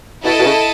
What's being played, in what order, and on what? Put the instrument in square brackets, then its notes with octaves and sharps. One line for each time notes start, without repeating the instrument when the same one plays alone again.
[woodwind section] B2 [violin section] E4 A4 D#5 A5
[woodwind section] B2
C#3